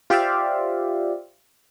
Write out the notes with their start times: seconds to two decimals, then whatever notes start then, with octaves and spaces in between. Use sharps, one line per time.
0.10 F4 G4 C5 D5 E5 F5